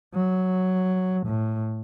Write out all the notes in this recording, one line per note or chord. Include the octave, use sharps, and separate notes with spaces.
F#3
A2